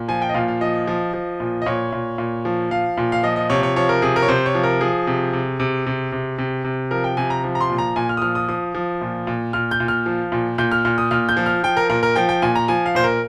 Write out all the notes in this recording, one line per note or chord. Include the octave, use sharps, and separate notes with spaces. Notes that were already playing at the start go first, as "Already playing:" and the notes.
Already playing: A#2
F3 G#5
G5
D#5
A#2 F5
F5
F3 D#5
F3
F3
A#2
D#5
A#2 C#5
A#2
A#2
F3
F3 F5
A#2
F5
F3 D#5
D#5
C3 C#5
C#5
F3 C#5
A#4
C3 G#4
A#4
C#5
C3 C5
C#5
F3
A#4
F3 G#4
C3
C3
C3
C3
C3
C3
C3
F3 A#4
G5
C3 G#5
A#5
F3
A#5
C6
A#2
A#5
A#2 G#5
F6
D#6
F3 F6
D#6
F3 D#6
F3
A#2
A#2
A#2 F6
G6
A#2
F6
F3
A#2
A#2 G6
F6
A#2 F6
D#6
A#2 F6
G6
F3
F6
F3 G5
A#4
A#2 A#4
A#4
F3 G5
G5
A#2 G#5
A#5
F3 G#5
F5
A#2 C5
A#4